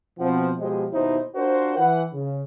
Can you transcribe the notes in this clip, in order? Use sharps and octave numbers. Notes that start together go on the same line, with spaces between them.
B2 F3 C4 F#5
B2 F3 G#3 G4 C5 D#5
D#2 B2 D#4 E4 C5
D4 F4 F#4 A#4 C5
E3 B4 F#5
C#3